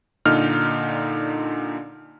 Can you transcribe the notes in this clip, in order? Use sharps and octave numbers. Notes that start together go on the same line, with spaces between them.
A#2 D3 D#4 F6